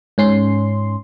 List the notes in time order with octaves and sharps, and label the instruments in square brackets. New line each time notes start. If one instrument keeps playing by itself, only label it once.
[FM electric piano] G#2 C#4 C6